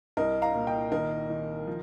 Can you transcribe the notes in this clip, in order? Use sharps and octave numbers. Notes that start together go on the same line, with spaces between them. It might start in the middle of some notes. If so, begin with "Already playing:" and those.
C2 A#4 D#5
F5 A#5
A#2
D#5 G5
D#3 A#4 D#5
D#3
F3